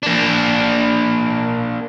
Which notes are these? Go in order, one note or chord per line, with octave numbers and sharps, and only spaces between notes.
A#3 D4